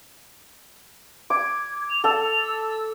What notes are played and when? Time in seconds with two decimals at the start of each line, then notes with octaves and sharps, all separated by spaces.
1.30 D6 G#6
1.89 F7
2.04 A4 A5
2.42 E6